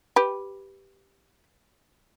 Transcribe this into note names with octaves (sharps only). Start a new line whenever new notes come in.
G4 B4